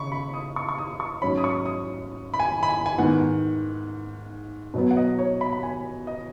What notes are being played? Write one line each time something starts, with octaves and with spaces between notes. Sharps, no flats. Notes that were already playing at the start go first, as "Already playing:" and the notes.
Already playing: C#3 B5 C#6
B5
D#6
C#6
C#6
D#6
C#6
G#2 F#3 C#4 B5
D#6
C#6
D#6
B5
G#5
B5
G#5
G#5
G#2 D#3 B3 F#5
B2 F#3 B3
F#5
D#5
C#5
B5
B5
G#5
D#5